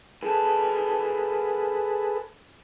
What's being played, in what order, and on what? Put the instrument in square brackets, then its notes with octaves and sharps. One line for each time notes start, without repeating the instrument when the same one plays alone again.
[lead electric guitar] F#2 A5 [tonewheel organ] G#4 A4 B4